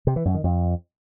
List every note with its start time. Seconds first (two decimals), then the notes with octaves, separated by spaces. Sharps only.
0.07 C3
0.16 E3
0.25 F#2
0.35 D#3
0.44 F2